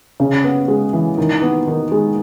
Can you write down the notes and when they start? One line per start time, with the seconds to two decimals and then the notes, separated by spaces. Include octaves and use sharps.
0.20 C#3
0.44 B3
0.68 G#3
0.93 E3
1.18 D#3
1.42 B3
1.67 D#3
1.92 G#3